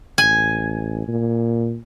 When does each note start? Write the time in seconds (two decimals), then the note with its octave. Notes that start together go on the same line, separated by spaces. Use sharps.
0.18 A1 G#5
1.08 A#2